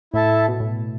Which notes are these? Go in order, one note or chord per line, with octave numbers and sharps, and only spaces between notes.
A2 E4 A4 E5 A5
B2
A2